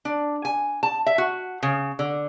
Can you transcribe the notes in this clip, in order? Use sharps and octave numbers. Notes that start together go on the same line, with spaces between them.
D4
G#5
A5
E5
F#4
C#3
D3